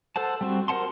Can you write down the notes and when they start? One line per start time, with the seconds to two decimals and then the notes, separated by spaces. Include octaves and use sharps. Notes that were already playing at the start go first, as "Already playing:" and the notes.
0.16 A4 C5 F#5 A5
0.41 G3 C4 F#4
0.68 A#4 C5 F#5 A5 C6